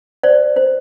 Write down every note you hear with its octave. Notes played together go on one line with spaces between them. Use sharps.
C5 D5
C5